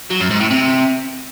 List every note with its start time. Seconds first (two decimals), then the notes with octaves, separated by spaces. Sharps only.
0.10 F#3
0.20 F#2
0.30 G#2
0.40 A2
0.50 C3